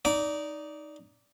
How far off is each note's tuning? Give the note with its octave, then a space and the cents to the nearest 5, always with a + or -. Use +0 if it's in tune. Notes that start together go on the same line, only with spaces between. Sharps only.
D#4 +0 D5 -15